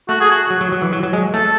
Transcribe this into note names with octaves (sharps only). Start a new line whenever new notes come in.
A3 F#4
G#4
F#4
F#3
F#3
F#3
E3
F#3
F#3
G#3
A3 A4